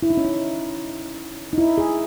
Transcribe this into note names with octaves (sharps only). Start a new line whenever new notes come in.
E4
D#4
C#4
D#4
D#4
E4
G#4